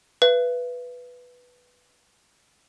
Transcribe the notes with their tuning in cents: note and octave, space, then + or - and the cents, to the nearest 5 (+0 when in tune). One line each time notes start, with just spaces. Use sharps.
B4 +0 E5 +45